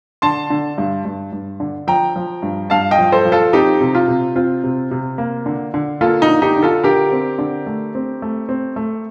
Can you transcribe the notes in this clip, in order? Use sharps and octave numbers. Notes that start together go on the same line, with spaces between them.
D3 A5 C6
D3
G2
G2
G2
D3
F3 G5 A#5
F3
G2
G2 F5 A5
D#5 G5
F3
A4 C5
F3
F4 A4
C4 D#4 G4
C3
F4
C3
C4 F4
C3
C3
A#3
D3
D3
A#3 F4 A4
D#4
D3
D#4 G4
D3
F4 A4
D3 G4 A#4
C4
D3
A3
C4
A3
C4
A3